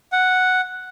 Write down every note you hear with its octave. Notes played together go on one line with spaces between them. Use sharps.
F#5